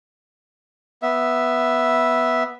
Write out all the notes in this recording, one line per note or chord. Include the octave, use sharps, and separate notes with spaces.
B3 E5